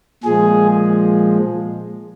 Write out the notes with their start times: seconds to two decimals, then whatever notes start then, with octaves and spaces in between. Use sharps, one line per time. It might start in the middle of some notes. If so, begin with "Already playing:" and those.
0.23 A#2 F3 G#3 G#4